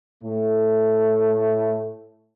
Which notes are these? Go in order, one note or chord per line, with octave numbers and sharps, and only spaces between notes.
A2 A3